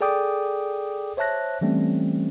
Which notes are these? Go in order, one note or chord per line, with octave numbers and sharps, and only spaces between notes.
G#4 A4 D5 G5 D6 D#6
C5 C#5 E5 A5 F#6 A#6
E3 G3 A3 C4 C#4